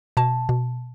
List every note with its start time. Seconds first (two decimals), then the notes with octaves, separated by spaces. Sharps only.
0.17 B2 A5
0.49 B2